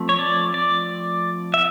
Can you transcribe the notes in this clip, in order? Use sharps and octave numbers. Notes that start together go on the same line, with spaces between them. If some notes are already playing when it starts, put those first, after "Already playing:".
Already playing: F3 A3 C4
C#5
D5
D5
E5